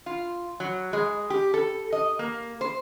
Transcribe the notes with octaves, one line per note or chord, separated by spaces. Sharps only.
F4
F#3
G#3
G4
A4
D#5
A#3
C5